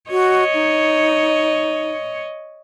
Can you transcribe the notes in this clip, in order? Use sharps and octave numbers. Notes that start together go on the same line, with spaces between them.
F#4 C#5 D#5
D#4